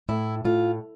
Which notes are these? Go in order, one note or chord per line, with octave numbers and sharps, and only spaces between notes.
A2 E4
A2 F4